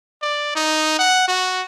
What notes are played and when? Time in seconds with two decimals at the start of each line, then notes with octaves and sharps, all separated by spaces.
0.22 D5
0.56 D#4
0.99 F#5
1.28 F#4